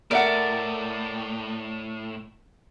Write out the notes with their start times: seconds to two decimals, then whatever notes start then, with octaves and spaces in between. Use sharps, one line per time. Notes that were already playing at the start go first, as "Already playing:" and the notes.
0.11 A2 A#4 D5 E5 F#5